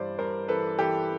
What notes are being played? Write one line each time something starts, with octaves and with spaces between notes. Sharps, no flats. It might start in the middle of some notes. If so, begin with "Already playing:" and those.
Already playing: G2 E3 C5 D5
G2 A#4 C5
E3 A4 B4
E3 G4 A4